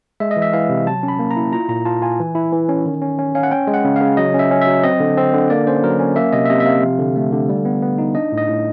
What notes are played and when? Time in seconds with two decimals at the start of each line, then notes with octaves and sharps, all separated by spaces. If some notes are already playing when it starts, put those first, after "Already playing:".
0.20 G#3 E5
0.31 D#5
0.36 E3
0.42 E5
0.53 E3 F5
0.69 C3
0.87 F#3 A5
1.03 C#4
1.08 B5
1.19 A#3
1.31 A#5
1.36 E4
1.52 F4 A#5
1.69 A#2 A#5
1.85 F4 A5
2.02 F4 G#5
2.20 E3
2.35 E4
2.53 E3
2.69 C#4
2.86 D#3
3.02 C#4
3.18 C#4
3.35 C#4 F5
3.43 F#5
3.51 C#4 G5
3.67 G#3
3.74 F#5
3.85 C#3
3.96 F5
4.01 C#3
4.17 F#3 D#5
4.34 C#4 E5
4.51 C#4
4.61 E5
4.67 F#3
4.84 C4 D#5
5.00 D3
5.18 C4
5.34 D3
5.50 A#3 D5
5.67 C#4 C5
5.83 F#3 A#4
6.00 C#4
6.16 A#3 E5
6.33 C3 D#5
6.45 E5
6.50 C3 D#5
6.60 E5
6.65 C3 F5
6.83 F3
6.99 D3
7.16 A3
7.32 D3
7.49 G3
7.65 B3
7.82 B3
7.98 D#4
8.15 D4 D#5
8.32 A2
8.37 D#5
8.48 A2